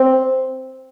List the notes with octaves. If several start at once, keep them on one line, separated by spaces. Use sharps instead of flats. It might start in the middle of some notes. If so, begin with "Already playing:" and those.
Already playing: C4